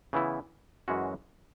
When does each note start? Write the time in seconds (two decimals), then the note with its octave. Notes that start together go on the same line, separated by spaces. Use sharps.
0.13 C#3 E3 B3 E4
0.88 F#2 E3 G#3 C#4 F#4